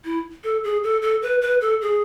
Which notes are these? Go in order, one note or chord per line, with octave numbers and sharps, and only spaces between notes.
E4
A4
G#4
A4
A4
B4
B4
A4
G#4